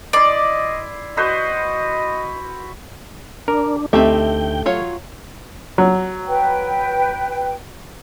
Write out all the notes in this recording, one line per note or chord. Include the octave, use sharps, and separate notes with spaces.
E4 D5 D#5 C6
F#4 B4 C5 D#5
D4 A#4
D2 A3 C4 D#4 G4 E5 G5
F#3 F4 C#5
F#3
B4 G5